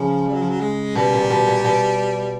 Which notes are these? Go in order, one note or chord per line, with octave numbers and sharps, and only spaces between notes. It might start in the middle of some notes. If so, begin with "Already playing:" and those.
Already playing: C#3 F3
G3
F#3
F3
F#3
G#3
B2 G3
A#2
B2
A#2
B2